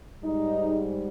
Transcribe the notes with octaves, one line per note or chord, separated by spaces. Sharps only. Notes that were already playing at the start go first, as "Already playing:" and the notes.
G#2 G3 D#4